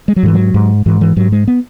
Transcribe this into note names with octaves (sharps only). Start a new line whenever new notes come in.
G#3
F#3
G#2 E3
F#3
G#2
G#2 E3
E3
G#2 F#3
G#3
B3